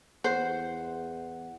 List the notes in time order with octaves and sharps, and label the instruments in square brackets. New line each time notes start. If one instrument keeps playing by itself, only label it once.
[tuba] E2 [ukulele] C5 [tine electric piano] F#5